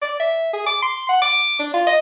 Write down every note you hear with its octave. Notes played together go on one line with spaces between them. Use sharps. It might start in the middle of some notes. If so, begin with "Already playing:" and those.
D5
E5
G#4
D6
C6
F#5
D6
D4
F4
D#5